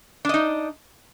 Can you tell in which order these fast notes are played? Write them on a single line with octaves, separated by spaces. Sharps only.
D4 D#5 D#4